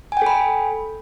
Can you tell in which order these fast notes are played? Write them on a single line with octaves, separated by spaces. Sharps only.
G#5 G5 A4 B5